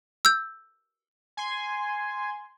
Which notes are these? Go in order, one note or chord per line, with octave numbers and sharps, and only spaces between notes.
E6 G6
G#5 C6